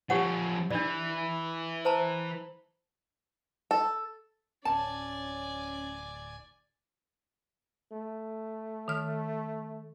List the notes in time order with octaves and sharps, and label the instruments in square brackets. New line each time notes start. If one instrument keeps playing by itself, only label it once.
[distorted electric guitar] F3 C#4 [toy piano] G4 C#5 F#5
[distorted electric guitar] E3 [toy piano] D4 D5
[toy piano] C5 A5 A#5
[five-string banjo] A4
[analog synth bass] D1 [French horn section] C#4 [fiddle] D5 G#5 [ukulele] A5
[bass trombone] A3
[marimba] D#3 F6